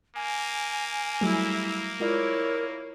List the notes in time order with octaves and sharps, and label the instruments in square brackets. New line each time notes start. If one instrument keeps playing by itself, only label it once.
[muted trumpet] A#3 [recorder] G#5
[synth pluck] F#3 G3 A3 [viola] E4 E5
[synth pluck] G#3 F4 D5 [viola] E4 C#5 [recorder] A#4